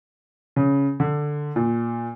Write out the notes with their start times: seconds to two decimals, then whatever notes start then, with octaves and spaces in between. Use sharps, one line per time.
0.56 C#3
1.00 D3
1.56 A#2